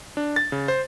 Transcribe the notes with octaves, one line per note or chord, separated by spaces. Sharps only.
D4
A6
C#3
C5